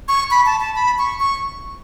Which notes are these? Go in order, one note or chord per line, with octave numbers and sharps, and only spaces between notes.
C#6
B5
A5
A5
B5
C#6
C#6